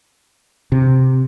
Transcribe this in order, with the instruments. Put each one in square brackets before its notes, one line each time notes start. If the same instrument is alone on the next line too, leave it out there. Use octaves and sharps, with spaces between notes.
[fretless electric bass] C3